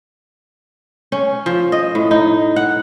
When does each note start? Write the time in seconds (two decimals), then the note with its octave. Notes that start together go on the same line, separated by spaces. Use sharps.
1.12 C#4
1.46 F3
1.72 D#5
1.95 A2
2.11 D#4
2.56 F#5